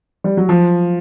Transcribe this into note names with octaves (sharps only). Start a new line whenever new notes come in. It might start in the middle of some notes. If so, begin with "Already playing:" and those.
G3
F#3
F3